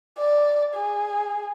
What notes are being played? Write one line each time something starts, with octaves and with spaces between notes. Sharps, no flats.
D5
G#4